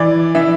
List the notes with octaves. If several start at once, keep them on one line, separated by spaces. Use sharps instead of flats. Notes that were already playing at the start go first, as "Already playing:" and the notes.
Already playing: E3 D5
E3 E5